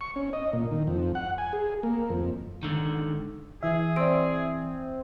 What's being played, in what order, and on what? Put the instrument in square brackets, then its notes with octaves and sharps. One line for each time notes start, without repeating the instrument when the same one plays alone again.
[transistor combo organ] C#6
C#4
D#5
A#2
D#3
F2
F#5
G#5
G#4
A#3
F2
[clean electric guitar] G#2 D3 D#3
[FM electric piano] E3 E5 [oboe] G#4
[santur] C4 [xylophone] D5 D7